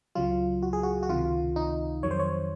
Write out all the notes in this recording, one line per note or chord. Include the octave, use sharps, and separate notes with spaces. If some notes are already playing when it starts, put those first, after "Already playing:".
C#2 C#3 F#3 F4
F#4
G#4
F#4
F#4
C#2 C3 D#3 F4
D#4
F2 D#3 F#3 C#5
C5
C#5